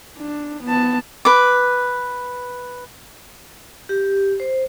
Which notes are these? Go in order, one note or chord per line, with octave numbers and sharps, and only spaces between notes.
D4
B3 A5
B4 D6
G4
C5